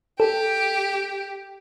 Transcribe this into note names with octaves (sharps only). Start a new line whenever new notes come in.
G4 A4